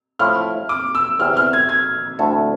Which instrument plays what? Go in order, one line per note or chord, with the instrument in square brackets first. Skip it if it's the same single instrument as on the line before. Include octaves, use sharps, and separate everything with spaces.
[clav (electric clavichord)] A2 F3 A3 E4 [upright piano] F6
[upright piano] D6
E6
[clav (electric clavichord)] E2 C3 E3 [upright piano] F6
[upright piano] F6
G#6
G#6
[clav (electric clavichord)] D2 D3 A3 E4 A4